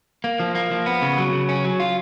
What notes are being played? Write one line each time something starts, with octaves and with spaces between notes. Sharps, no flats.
A#3
F3
A#3
F3
B3
C#3
F#3
C#3
C#4
F#3
F4